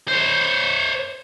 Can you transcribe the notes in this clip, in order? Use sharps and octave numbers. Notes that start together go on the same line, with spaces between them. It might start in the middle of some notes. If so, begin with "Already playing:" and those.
C5 C#5